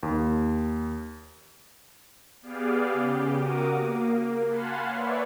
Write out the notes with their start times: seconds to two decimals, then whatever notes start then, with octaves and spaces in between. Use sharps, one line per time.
0.03 D#2
2.42 B3 G4 G#4 D5 F5
2.94 C#3 G4
3.35 F#4 A#4 D6 D#6
3.78 A#3
4.47 F5 F#5 G#5 A5 B5 C6
4.87 B4 C#5 D5 E5